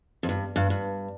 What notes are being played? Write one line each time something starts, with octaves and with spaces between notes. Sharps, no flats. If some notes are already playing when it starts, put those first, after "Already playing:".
F2
G2
G2
G2